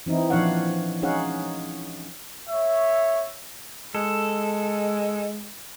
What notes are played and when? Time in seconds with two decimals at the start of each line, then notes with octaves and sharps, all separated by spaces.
0.06 E3 C4 D#4 E4
0.30 A#2 F3 D4 C#5 F5 F#5
1.02 C#4 D#4 G#4 C#5 F5 F#5
2.49 C#5 E5
3.95 G#3 A4